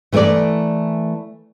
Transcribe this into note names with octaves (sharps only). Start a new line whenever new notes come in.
E3 A3 E4 A#4 D5